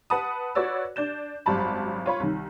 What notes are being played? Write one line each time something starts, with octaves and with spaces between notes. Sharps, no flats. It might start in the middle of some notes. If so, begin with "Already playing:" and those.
B4 F#5 A5 B5 D#6
F#4 B4 C#5 D5 E6
D4 D5 G6 E7
G#1 F#2 G3 A5 B5
F4 C#5 B5
C2 D#3